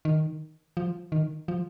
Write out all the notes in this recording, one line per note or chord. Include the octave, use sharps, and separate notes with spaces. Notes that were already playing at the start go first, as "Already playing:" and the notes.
D#3
F3
D#3
F3